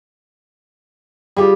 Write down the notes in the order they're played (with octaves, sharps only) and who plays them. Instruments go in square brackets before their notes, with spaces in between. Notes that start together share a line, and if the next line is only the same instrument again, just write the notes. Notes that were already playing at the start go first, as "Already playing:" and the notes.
[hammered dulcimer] G3 [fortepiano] F4 G4 G#4